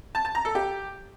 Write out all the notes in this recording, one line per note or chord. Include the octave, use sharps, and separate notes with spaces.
A5
A5
A#5
A4
G4